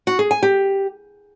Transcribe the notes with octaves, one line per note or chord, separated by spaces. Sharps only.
F#4
G#4
G#5
G4